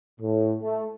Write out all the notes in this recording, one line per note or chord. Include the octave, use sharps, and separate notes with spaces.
A2
A3